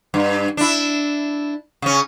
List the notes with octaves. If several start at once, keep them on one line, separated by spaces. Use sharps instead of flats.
G2
D4 E4
C#3 C#4